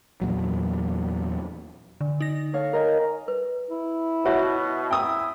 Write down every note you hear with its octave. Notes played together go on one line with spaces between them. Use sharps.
E2 A#2 F#3
D3
D#4 A#6
A4 C#5 F5
A#4 D#5 G#5
B4
E4
B2 F#4 C#5 E5
E4 G5 D#6